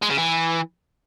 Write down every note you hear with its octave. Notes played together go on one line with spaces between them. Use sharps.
G#3
C#3
E3